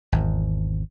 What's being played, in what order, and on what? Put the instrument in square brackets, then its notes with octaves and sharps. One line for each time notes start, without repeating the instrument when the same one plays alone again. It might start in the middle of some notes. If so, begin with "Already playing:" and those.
[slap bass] G#1 E2